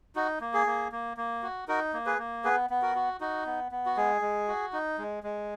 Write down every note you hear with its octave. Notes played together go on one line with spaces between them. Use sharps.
D#4 F#4
A#3
G#4
A#3
A#3
A#3
F#4
D#4 F#4 A#4
A#3
G#4 B4
A#3
B3 G#4 B4
B3
F#4 A#4
F#4
D#4 F#4
B3
B3
F#4
G#3 G#4
G#3
F#4
D#4
G#3
G#3